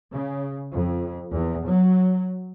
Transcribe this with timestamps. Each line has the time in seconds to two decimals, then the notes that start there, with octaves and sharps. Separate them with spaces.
0.12 C#3
0.72 F2
1.32 E2
1.67 F#3